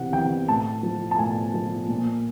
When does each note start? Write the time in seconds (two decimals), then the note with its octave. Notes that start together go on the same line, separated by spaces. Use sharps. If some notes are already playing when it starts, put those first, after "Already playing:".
Already playing: C3 E3 F#5
0.13 E3 G5
0.48 A2 A5
0.83 F3
1.11 A5
1.18 A2 G#5
1.54 F3
1.88 A#2